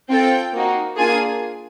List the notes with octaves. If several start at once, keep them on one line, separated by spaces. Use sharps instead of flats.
C4 F4 A4 G5
A#3 D#4 F#4
A#3 D4 F4 G#4 G#5